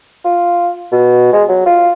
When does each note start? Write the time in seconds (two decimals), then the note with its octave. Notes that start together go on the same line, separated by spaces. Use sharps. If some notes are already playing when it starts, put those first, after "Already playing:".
0.24 F4
0.92 B2
1.33 G#3
1.49 F#3
1.66 F4